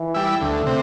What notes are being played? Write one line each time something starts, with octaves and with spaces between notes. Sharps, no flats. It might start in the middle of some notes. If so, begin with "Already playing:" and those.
Already playing: E3
G3 E4
D2 A3
C3